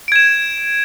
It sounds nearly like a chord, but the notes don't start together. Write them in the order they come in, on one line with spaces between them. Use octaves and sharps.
D7 G#6 E7